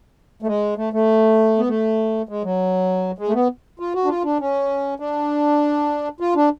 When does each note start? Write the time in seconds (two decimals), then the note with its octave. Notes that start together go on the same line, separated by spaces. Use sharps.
0.42 A3
0.47 G#3
0.77 A3
0.93 A3
1.58 B3
1.68 A3
2.29 G#3
2.44 F#3
3.19 G#3
3.28 A3
3.34 B3
3.80 F4
3.95 F#4
4.05 D4
4.09 F4
4.24 D4
4.40 C#4
5.00 D4
6.20 F4
6.36 D4